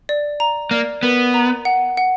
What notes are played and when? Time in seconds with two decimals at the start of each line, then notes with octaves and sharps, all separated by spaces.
0.09 D5
0.40 A#5
0.71 A#3 D5
1.03 B3 A#4
1.34 A#5
1.65 F#5
1.97 F#5